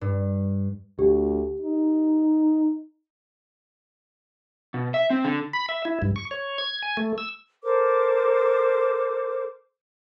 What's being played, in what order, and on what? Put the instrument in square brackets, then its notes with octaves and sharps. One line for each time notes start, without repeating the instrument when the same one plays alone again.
[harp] G2
[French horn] D2 [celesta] G4
[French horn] D#4
[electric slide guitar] B2
E5
C4
D3
[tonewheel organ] B5
E5
E4
G2
C#6
C#5
G#6
G#5
A3
E6
[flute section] A4 A#4 C5 D6